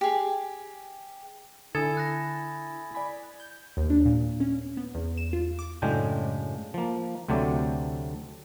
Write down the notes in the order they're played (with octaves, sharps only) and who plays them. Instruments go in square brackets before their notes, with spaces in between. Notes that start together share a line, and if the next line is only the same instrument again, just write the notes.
[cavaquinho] G4 G#4
[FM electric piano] D3 [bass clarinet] E4 [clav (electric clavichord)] A4 [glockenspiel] G#5 D#6 G#6
[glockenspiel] F#6 A6 A#6
[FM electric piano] D5 G#5 B5
[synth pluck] G6
D#2
D4
A#2
C#4
B3
E2
E7
F4
D6
[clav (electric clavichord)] F#2 A2 C#3 G#3 D4 G5
F3 A#3
D2 C3 F#3 A3 C4 D5